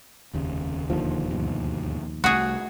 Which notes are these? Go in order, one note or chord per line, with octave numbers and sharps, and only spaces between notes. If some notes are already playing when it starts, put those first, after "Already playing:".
F1 D#2 C#3
E1 D#2 D3 F3
D2 G2 B2
C2 A3 F#4 G#4